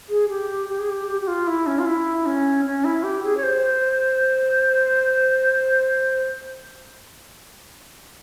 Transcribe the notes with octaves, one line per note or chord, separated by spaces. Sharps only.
G#4
G4
G4
G#4
G4
G4
G4
F4
E4
C#4
F4
E4
C#4
C#4
E4
G4
G#4
C#5
C5